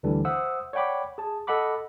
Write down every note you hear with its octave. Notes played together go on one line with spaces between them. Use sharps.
D2 D3 E3 G3 D4
C5 E5 F#5 D#6 E6
C#5 D5 F#5 G5 B5 D6
G#4 A5
A4 D#5 F#5 B5 D6